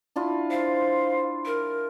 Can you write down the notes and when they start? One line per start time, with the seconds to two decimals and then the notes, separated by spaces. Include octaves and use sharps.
0.16 D4 E4 F4
0.51 C5 F5
1.46 A#4